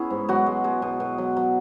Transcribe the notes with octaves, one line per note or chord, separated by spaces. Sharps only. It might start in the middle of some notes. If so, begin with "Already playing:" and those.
Already playing: B3 C#4 E4 G#4
G#2
B2 F#3 F#4
G#3
G#3
B2
B2
F#3
F#3